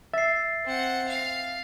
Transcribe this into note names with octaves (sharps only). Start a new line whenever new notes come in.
E5 A6 C7
C4 F#5
F5